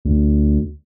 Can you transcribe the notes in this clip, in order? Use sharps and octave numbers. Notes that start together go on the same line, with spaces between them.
D2